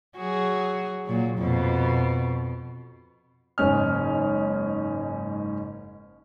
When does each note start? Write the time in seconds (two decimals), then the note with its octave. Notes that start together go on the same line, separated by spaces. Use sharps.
0.18 F#3 F#4 G#4
1.06 A#2 F#3
1.38 F2 B2
3.58 F#1 G#2 C#4 F6